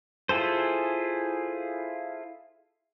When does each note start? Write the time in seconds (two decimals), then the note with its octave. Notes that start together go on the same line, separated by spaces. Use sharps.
0.29 E4 F4 G#4 A4 C5